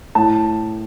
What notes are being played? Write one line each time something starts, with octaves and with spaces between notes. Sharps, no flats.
A2 A5